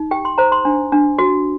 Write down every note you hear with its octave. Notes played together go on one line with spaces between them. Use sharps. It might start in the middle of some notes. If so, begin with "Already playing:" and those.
Already playing: D#4
G4 G5
C6
C5 A#5
C6
D4
D4
F#4